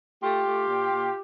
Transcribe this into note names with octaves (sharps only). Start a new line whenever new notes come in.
A3 F4 G4
A3
A#2
A#2